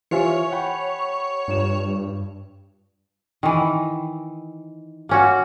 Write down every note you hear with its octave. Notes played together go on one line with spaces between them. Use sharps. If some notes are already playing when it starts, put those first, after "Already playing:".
E3 F4 G4 C5 C#5 E5 G#5
F#5 G5 B5
G2 F4 E7
D#3 E3
A#3 C#4 F#4